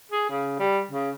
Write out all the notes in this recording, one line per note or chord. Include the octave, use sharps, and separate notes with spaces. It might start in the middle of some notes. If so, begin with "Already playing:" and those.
G#4
C#3
G3
C#3